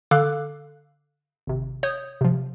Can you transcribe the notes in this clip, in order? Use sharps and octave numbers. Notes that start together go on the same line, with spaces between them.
D3 A4 F5 D6 F#6
G#1 C3
C#5 D#6 G6
C3 F3